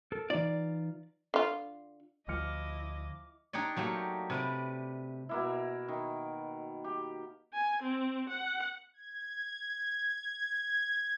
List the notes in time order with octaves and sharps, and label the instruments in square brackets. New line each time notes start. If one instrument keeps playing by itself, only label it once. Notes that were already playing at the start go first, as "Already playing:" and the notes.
[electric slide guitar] A4 A#4
[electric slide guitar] E3 D#4 F4 [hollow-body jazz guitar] D5
[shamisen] D3 F4
[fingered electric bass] D2 [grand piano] F3 F6 C#7 [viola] E4 D#5 [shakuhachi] D6
[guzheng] D4 D#4 G4 C#5 D5
F#3 A3 A#3 G4
C3 B4 D5
[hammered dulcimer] B2 A#3 E4
D#3
G4
[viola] G#5
C4
F#5
[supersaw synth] G#6
G#6